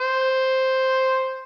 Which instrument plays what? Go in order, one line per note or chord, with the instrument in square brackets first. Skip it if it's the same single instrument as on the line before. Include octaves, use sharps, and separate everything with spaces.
[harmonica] C5